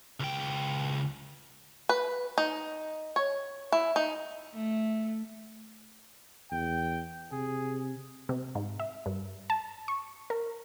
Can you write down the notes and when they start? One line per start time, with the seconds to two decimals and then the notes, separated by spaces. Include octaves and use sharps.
0.20 C#2 G5
1.89 B4
2.38 D#4
3.16 C#5
3.72 E4
3.96 D#4
4.55 A3
6.51 E2 G5
7.32 C3 G#4
8.29 C3
8.55 G#2
8.80 E5
9.06 G2
9.50 A5
9.88 C#6
10.30 A#4